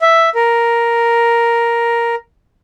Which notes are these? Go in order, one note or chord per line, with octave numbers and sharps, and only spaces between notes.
E5
A#4